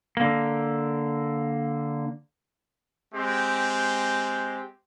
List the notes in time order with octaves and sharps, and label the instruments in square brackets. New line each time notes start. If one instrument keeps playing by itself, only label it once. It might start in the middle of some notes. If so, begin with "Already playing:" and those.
[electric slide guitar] D3 A#3
[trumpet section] G#3 C4 G4